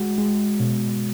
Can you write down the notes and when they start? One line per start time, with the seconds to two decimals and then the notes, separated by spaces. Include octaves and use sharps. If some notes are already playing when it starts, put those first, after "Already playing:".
Already playing: G#3 F#4
0.18 G#3
0.60 B2